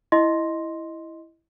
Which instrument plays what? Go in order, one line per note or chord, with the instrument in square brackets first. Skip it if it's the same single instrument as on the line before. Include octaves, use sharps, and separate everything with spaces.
[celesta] E4 D#5 C6 A#6